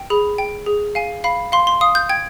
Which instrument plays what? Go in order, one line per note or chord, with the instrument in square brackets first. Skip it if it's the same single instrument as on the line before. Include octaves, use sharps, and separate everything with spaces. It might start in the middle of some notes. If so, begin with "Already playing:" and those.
Already playing: [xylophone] G5
G#4 B5
G5
G#4
F5 G#5
F5 B5
F5 C6
C6
F5 D#6
G6
G5 G#6